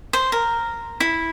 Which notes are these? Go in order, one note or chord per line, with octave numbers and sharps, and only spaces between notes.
C5
A#4
E4